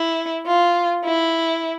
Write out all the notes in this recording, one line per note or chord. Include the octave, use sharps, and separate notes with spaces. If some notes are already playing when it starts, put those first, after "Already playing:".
Already playing: E4
F4
E4